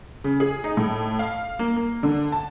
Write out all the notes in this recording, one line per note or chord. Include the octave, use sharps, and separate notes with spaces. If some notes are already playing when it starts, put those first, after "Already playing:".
C#3
G#4
D#4
A2
F5
A#3
A#3
D3
A5